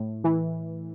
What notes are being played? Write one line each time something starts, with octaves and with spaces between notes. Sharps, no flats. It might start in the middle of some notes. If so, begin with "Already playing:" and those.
Already playing: A2
E3